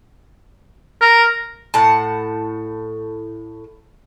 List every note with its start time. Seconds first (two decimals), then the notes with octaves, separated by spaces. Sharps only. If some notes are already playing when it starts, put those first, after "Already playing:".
1.01 A#4
1.74 A2 F#5 A5